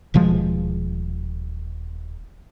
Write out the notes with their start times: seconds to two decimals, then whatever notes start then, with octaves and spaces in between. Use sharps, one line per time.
0.14 D#1 B2 F3 G#3